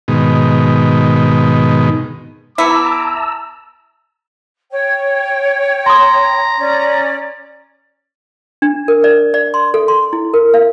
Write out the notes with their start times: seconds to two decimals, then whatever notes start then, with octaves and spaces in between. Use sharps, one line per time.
0.08 G#2 B2 D#3
2.58 B3 E4 A5 A#5 D6 E6
4.71 C#5 G5
5.86 A#5 C6 D#6
6.57 C#4 D5
8.62 D4
8.88 A#4
9.04 D5
9.34 D5
9.54 C6
9.74 A4
9.88 C6
10.13 E4
10.34 A#4
10.54 F5